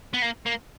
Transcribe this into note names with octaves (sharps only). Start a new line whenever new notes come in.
B3
A#3
A#3